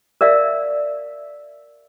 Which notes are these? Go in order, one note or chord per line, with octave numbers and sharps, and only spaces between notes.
A#4 D5 E5 F5